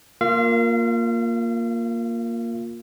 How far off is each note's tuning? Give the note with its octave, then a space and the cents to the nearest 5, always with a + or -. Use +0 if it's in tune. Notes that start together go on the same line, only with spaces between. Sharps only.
A#3 +0 F4 +15 F5 -35